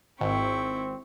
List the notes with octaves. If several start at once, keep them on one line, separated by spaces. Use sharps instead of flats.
G#1 C4 E4 G5 C#6